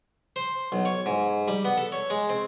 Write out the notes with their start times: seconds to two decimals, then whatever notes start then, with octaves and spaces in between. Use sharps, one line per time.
0.36 C5
0.72 B1
0.85 C#5
1.06 G#2
1.48 G3
1.65 B3
1.78 A4
1.92 C#5
2.10 G#3
2.29 C4